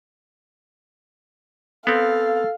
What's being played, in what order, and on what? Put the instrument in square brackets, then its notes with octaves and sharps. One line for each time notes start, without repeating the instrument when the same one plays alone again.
[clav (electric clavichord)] B3 C4 [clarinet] A4 [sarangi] F5